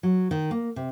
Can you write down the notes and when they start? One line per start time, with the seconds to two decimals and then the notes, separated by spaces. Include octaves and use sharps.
0.03 F#3
0.31 D#3
0.51 A#3
0.76 C3